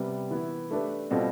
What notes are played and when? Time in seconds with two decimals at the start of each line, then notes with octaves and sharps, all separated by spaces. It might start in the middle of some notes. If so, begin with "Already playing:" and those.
Already playing: C3 G3 B3
0.31 E3 B3 E4
0.71 A3 D4 G4 B4
1.11 B2 G3 C4 F4 A4